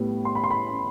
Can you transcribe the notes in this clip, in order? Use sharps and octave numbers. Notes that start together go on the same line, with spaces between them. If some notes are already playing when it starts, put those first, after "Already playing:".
Already playing: A2 G3 B3
C6
B5
C6
B5